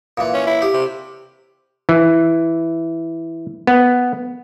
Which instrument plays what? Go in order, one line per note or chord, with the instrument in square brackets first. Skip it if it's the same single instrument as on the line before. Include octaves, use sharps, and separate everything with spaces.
[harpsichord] A#2 E3
[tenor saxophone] C#4
E4
[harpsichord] G4
[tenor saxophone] C3
[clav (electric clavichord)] E3
B3